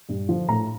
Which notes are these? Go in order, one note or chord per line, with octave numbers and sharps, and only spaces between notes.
G2
D3 F3
A2 A#5